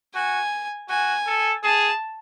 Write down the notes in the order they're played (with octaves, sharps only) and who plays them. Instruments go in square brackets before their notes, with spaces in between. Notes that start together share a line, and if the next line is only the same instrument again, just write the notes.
[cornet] F#4 [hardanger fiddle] G#5
[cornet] F#4 [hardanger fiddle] G#5
[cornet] A4
[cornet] G#4 [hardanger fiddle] A5